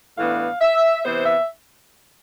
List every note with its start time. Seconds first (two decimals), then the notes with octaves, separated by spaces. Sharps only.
0.18 A2 E3 B3 D4 F5
0.61 E5
1.05 C3 E3 B3 C5
1.26 E5